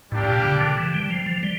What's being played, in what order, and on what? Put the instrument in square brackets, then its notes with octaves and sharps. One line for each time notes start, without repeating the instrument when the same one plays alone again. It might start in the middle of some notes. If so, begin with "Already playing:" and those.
[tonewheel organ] A2 [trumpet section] G3 A#3 D4 G4
[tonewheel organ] A#2
C#3
D3
E3
G3
F3
F3
G3